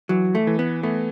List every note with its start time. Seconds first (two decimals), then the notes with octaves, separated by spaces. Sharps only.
0.09 E3 F#3
0.35 A3
0.47 E3
0.59 B3
0.83 A3 B3